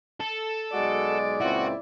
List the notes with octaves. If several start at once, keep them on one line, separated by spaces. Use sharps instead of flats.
A4
B1 G#3 F#4 D5
C#2 A#2 C4 E4 F#4